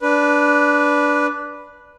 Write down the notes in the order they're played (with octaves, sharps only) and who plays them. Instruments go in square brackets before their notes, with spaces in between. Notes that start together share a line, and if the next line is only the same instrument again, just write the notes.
[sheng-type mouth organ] D4 B4